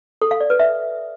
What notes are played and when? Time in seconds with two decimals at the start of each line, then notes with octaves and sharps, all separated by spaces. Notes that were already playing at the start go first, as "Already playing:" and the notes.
0.21 A4
0.31 F5
0.41 D5
0.50 B4
0.60 E5